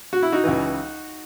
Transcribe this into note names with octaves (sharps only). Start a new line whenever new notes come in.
F#4
E4
D#4 F#4
C#2 C#3 E3